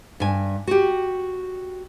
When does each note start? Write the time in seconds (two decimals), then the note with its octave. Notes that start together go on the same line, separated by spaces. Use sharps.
0.20 G2 G#5
0.67 F#4 G4